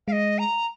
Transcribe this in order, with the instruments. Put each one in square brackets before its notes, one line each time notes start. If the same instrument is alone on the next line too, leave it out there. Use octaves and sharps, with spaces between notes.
[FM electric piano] G#3 [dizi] D#5 F5
[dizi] A#5